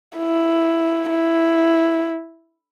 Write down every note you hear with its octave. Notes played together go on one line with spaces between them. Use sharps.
E4
E4